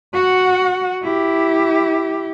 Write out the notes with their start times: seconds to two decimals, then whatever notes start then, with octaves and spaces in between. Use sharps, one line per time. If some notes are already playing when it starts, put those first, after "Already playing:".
0.14 F#4 F#5
1.02 E4 G4